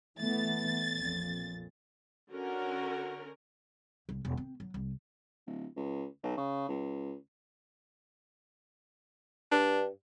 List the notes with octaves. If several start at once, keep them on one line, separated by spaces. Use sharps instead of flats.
E3 A3 B3 A6
A#1 F2 A#2
D3 C#4 F#4 A#4
C2
E1
C4
F#3
C2
D1
C#2
B1
C#3
C#2
G2 D4